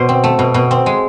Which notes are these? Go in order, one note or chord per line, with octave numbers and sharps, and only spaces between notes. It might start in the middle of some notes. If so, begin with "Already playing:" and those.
Already playing: B2 C5
C4
A3
B2
B2
C4
G#3